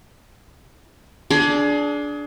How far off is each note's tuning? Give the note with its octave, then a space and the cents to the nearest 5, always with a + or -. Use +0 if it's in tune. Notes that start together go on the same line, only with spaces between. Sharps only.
D4 -10 G#4 +25